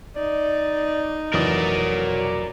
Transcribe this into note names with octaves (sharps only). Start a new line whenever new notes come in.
D#4 D5
F1 E3 F#3 A#4 D5 D#6